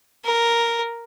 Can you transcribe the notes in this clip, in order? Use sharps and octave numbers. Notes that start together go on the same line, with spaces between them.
A#4